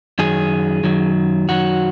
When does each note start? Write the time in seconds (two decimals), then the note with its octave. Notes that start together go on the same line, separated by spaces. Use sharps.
0.19 F#2 D#3 F#3 G#4
0.83 F#2 D#3 F#3
1.48 F#2 D#3 F#3 F#4